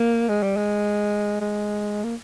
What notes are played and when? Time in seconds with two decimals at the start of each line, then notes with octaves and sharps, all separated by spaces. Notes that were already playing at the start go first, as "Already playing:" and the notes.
Already playing: A#3
0.29 G#3
0.42 G3
0.56 G#3
1.41 G#3
2.04 A#3